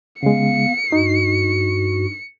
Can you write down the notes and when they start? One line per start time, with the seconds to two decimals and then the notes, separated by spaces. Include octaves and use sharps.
0.23 C#3 G#3 B3 F5 C#7
0.92 G2 D#4 F#4